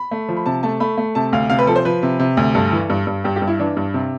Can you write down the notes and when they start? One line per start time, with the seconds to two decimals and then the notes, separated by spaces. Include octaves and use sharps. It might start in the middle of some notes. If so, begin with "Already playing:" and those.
Already playing: B5
0.11 A3
0.29 F3
0.37 B5
0.46 C3 A5
0.63 A3 A5
0.80 A3 B5
0.98 A3
1.15 C3 A5
1.33 D2 F5
1.50 C3 F5
1.59 B4
1.67 F3 A4
1.76 C5
1.85 F3 B4
2.03 C3
2.19 C3
2.37 D2
2.54 G2 A4
2.72 E3
2.90 G2
3.07 G2
3.24 G2 G4
3.36 G4
3.42 G2
3.48 E4
3.59 E3 D4
3.77 G2
3.94 C3